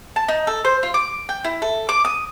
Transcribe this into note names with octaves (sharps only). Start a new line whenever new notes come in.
A5
D#4
A4
C5
F4
D6
G5
E4
A4
D6
D#6